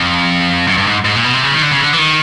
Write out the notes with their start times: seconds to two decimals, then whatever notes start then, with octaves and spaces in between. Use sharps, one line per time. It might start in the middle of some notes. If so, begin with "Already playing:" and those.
Already playing: F2
0.68 F#2
0.77 G2
0.87 G#2
1.05 G#2
1.15 A#2
1.24 B2
1.33 C3
1.43 C#3
1.52 D#3
1.62 D3
1.71 C#3
1.80 D3
1.93 E3
1.99 D#3